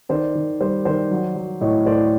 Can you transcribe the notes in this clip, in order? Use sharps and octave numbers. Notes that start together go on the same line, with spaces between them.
D#3 C5 D5
D#3
G3 C5 D5
D#3 C5 D5
F#3
F#3
A2 C#5 D#5
A2 C5 D5